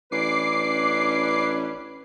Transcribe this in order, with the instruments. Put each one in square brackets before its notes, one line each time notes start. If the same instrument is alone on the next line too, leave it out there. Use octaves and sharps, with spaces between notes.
[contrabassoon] A1 [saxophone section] C#4 D4 B4 [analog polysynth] D6 C7